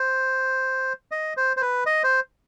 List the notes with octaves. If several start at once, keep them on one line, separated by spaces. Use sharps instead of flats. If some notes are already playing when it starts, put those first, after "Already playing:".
Already playing: C5
D#5
C5
C5
B4
D#5
C5